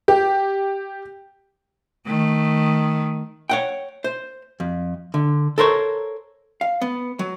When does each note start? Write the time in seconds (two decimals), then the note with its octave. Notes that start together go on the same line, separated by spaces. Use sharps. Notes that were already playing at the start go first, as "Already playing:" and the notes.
0.08 G4
2.07 D#3 A3
3.50 C#5 F#5 G5
4.04 C5
4.60 F2
5.14 D3
5.58 A4 A#4 C5 C#5
6.61 F5
6.82 B3
7.19 F#3